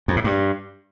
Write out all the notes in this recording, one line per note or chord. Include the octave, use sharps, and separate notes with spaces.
F2
A2
G2